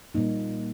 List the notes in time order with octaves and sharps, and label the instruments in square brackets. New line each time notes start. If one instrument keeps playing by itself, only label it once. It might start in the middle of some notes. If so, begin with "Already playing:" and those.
[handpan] A#2 G3 A#3 D#4